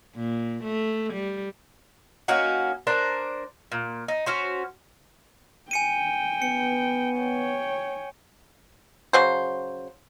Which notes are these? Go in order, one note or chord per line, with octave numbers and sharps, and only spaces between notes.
A#2
A3
G3
A#3 C#4 D#4 F#4
D4 A#4 C5
A#2
D#4
C#4 F#4 C5
G5 G#5 C#7 D#7
B3 C#7
C#5 G5
C#3 F#3 C5